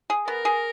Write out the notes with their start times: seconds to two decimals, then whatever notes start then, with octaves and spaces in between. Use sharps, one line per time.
0.10 G#4
0.27 B3 A#4
0.45 G#4